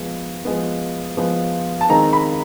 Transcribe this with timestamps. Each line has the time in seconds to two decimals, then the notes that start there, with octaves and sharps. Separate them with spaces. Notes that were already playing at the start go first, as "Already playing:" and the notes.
Already playing: F3 G#3 B3
0.45 F3 G#3 B3
1.17 F3 G#3 B3
1.81 A5
1.89 D#3 G#3 C4 A#5
2.13 B5